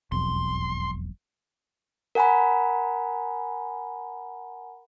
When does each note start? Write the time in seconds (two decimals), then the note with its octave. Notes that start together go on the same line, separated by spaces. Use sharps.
0.12 E1 B1 F2 C6
2.15 A#4 F#5 G#5 A#5 B5